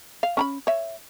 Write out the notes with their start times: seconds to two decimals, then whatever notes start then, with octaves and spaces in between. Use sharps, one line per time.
0.23 F5
0.37 C#4 A#5 B5
0.67 C#5 E5